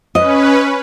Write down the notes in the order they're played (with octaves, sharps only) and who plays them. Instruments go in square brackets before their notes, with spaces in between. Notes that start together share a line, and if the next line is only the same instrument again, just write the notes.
[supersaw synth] C#4 B4 [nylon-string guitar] D#5